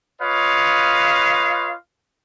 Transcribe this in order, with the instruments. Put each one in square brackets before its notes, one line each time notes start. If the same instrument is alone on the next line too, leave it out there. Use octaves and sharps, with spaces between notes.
[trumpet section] F4 B4 C#5 D#5 F5